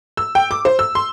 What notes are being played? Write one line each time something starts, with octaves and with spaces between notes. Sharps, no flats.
E6
G5
D6
C5
E6
C6